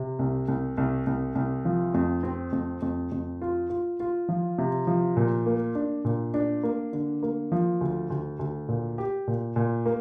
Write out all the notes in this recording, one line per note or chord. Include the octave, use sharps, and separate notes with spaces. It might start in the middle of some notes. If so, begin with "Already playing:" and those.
Already playing: C3
C2
C2
C2
C2
C2
F3
F2
C4
F2
F2
F2
F4
F4
F4
F3
C3
F3
A#2
A#3
D4
A#2
D4
A#3
D3
A#3
F3
D2
D2
D2
A#2
G4
A#2
A#2
A#3